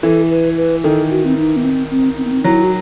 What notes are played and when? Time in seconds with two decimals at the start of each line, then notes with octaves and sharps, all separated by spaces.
0.03 E3 A4
0.30 B4
0.57 B4
0.84 D#3 A4
1.10 F#4
1.25 C4
1.37 D#4
1.56 B3
1.64 C4
1.91 C4
2.18 C4
2.25 B3
2.31 C4
2.44 F#3 E4
2.63 F#4